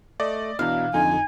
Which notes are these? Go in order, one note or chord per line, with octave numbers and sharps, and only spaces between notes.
A3 D5 D#5
B2 E3 D4 E4 F5 A#5
F2 D3 D#4 F4 G#5